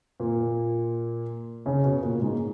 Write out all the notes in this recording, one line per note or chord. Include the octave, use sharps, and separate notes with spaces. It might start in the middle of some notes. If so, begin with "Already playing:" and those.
A#2 A#3
C#3 C#4
B2 B3
A#2 A#3
G#2 G#3